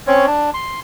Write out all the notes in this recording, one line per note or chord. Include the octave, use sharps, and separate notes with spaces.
C4 C#4 C#5
D4
C6